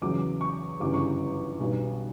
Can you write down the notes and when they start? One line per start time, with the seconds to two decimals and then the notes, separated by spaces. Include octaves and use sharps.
0.02 E2 C#3 F#3 D6
0.41 C#6
0.80 G1 F#2 C#3 E3 G3 D6
0.94 C#6
1.60 B1 B2 G3 B3